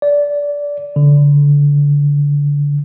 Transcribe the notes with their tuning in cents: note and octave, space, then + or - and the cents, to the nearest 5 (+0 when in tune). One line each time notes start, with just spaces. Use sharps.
D5 -15
D3 -25